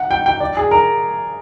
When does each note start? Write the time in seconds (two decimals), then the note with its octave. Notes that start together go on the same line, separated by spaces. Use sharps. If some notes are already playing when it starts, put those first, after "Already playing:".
Already playing: F#5
0.11 G5
0.26 G5
0.40 D5
0.57 G#4
0.71 A#4